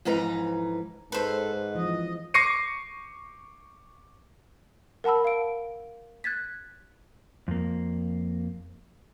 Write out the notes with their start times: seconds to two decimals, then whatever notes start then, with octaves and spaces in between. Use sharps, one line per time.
0.05 F2 G#2 E3 B4 A#5
1.12 G#2 A4 B4 C5
1.75 E3 F3 D#5
2.34 C#6 D6 A#6 C7 C#7 D#7
5.04 A#4 F#5 A5 B5 E6
5.24 F5 D7
6.24 F#6 G#6 A6 B6
7.48 F2 A#3